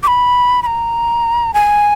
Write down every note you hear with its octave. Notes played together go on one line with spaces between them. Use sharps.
D6
B5
B5
A#5
G#5